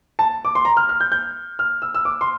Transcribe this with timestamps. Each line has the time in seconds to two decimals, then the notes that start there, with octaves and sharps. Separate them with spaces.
0.19 A5
0.45 D6
0.55 C6
0.65 A#5
0.77 F6
0.89 F6
1.00 G6
1.12 G6
1.59 F6
1.82 E6
1.95 E6
2.05 D6
2.21 C6